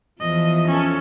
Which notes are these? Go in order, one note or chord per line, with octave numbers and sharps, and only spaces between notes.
E2 E3 F3 D#5
C#4 A4